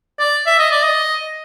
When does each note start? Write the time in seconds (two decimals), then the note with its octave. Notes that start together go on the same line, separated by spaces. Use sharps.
0.19 D5
0.46 E5
0.59 D#5
0.71 D5
0.83 D#5